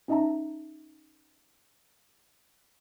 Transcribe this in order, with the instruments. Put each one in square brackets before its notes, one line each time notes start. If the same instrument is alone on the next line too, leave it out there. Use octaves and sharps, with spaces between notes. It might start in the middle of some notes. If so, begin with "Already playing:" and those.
[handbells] C#4 D#4 D#5 E5 A5 A#5